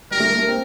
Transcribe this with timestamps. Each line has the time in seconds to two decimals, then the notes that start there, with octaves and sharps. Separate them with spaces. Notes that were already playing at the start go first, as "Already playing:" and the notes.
0.11 G3 A#4
0.20 A3
0.29 A#3
0.39 A3
0.48 C4